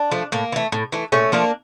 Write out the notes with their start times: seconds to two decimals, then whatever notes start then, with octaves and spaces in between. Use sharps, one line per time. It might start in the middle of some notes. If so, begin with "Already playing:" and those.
Already playing: D4
0.11 F3 A3
0.32 A2 A#3
0.52 E3 A3
0.72 A2
0.92 E3 A3
1.12 A#2 A3 C#4
1.32 F3 A3 A#3 D4